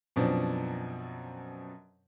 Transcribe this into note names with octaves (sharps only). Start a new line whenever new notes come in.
F#2 B2 F3 C4 D4